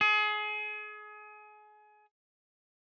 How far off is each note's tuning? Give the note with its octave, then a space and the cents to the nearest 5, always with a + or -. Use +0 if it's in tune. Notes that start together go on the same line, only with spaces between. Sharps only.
G#4 +30